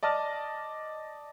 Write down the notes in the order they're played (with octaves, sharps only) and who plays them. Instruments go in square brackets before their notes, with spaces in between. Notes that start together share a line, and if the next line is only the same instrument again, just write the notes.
[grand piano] D5 D#5 A5 F6